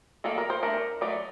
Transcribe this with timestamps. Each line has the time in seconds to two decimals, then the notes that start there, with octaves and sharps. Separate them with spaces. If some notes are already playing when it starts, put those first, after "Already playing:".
0.24 D#3 G3 A#3 A4
0.38 A#4
0.50 C5
0.63 A3 D4 A#4
1.01 F#3 A3 D#4 D5